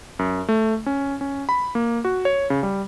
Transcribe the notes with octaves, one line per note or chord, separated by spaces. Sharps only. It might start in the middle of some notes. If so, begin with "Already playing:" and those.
F#2
A3
C#4
C#4
B5
A#3
F#4
C#5
C#3
G3